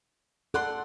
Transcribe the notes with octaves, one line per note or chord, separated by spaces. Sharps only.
A4 D5 F#5 C6